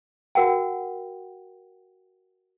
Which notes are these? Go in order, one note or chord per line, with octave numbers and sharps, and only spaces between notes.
F#4 A#4 F#5 G5